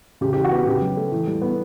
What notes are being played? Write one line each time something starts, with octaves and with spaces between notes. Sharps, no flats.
C#3 G4
E3 G4
F#4
B3 G4
C#3 G4
F#3
A3
E3
G3
B3